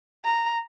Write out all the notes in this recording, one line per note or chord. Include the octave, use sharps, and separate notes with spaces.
A#5